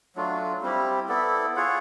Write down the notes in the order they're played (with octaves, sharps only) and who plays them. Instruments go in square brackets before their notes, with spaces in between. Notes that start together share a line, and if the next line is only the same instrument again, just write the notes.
[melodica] F#3 A3 D4 F4
G3 C4 E4 G4
B3 E4 A4 D5
F4 G#4 C#5 F#5